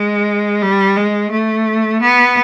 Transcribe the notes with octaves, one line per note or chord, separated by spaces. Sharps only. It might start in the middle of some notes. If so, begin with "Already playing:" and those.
Already playing: G#3
G3
G#3
A3
B3